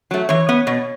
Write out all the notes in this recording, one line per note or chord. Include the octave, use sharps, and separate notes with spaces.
F#3 A3
E3 C#5
B3
B2